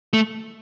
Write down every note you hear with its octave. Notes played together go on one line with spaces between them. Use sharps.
A3